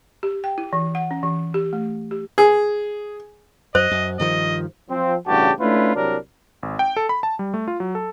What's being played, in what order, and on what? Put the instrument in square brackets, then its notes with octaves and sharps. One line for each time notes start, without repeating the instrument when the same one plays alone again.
[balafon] G4
G5
E4
E3
F#5
C#4
E3
G4
A3
G4
[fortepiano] G#4
[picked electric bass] F#2 [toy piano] C5 [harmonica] D#5
[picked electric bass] F#2
[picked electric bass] G2 D#3 F3 [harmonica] D#5
[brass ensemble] F3 C4
A1 G2 C#3 F#4 G4 A5
A3 C#4 D4 E4 F4 B4
C2 F#3 G3 D4 A#4
[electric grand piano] G#1
G5
A4
B5
A5
G3
A3
F4
F#3
A4